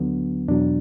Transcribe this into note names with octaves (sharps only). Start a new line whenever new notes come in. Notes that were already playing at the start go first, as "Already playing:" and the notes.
Already playing: D2 D3 F#3 B3
E2 B2 F#3 D4